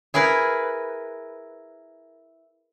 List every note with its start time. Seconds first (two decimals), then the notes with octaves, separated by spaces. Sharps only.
0.14 E4 G#4 A#4 B4